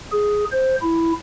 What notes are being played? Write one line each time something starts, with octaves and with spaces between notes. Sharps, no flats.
G#4
C5
E4